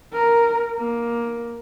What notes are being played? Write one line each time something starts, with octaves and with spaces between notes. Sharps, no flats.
A#4
A#3